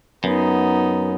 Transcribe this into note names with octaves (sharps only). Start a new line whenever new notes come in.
F#2 B3 D#4